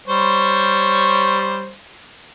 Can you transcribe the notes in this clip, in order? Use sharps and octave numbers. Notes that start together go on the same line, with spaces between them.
G3 C5 C#5